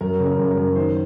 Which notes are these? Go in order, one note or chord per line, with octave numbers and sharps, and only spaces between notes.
F#2 A#4
C#3
A#4
F#2
A#4
F#2
D#3 C5